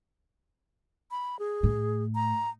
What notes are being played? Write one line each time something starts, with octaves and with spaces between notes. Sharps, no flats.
B5
G#4
A2
A#5